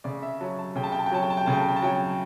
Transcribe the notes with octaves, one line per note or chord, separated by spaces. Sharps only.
C#3 D5
E5
F#3 A5
A5
C#3 G5
A5
G5
A5
G5
F#3 A5
G5
A5
G5
C#3 A5
G5
A5
G5
A5
F#3 G5